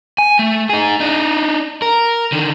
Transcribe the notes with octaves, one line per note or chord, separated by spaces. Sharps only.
G#5
A3
D#4 G#4
D4 D#4
A#4
D3 D#3